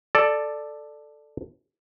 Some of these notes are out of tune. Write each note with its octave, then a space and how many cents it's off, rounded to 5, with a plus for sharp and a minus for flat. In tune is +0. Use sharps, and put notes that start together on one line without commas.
A4 +0 D5 +10